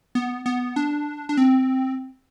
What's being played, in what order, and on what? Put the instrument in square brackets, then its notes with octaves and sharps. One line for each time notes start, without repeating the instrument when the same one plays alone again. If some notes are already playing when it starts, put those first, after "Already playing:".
[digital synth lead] B3
B3
D4
D4
C4